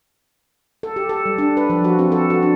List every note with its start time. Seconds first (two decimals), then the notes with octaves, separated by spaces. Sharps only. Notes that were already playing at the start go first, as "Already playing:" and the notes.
0.83 A4
0.96 G4
1.09 A4
1.26 G3
1.38 D4
1.57 B4
1.70 F3
1.84 F#4
1.99 C4
2.12 A4
2.30 F#4
2.43 D4